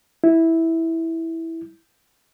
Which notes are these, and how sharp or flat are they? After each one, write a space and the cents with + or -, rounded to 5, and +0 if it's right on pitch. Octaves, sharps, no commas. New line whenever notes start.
E4 -10